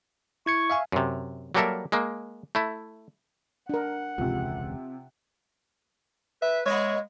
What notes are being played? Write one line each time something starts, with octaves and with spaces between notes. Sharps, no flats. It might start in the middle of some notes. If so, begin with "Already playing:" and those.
E4 C#6 G#6 C#7
E5 F5 G#5
F#2 C3
F#3 G3 A#3 A4 A#4 E5
G#3 A#3
A3 E4
D4 A#4 F#5
E1 C#2 C3 F3
B4 E5
G#3 A#3 C#5 D#5 E5